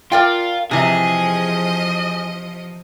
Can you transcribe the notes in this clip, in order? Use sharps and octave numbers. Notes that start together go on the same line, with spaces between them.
F4 A#4 D5 G5
C3 E3 F3 G#4 D#5